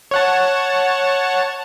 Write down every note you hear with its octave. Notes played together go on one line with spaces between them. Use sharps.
C#5 F#5 A5